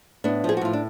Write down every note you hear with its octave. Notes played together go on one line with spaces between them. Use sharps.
A2 B3 D4
F3 G#4
F#4
A2 F4
D4